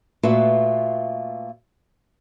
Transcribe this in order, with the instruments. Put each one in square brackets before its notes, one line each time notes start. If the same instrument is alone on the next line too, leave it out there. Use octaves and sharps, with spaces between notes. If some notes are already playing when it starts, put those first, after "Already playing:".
[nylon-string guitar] A#2 A3 F4 F#4 B4 E5